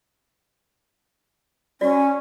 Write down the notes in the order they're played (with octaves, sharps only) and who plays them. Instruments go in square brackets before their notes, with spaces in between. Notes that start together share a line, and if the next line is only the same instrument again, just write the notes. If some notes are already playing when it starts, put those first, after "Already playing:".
[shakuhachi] C#4 [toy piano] F#4 D5